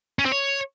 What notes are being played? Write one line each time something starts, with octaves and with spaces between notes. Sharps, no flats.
C#4
C4
C#5